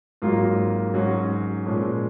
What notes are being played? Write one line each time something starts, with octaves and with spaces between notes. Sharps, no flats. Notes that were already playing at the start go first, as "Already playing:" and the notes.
G#1 G#2 F#3 A#3 F4
G#2 F#3 C#4 F#4
A#2 F3 G#3 C#4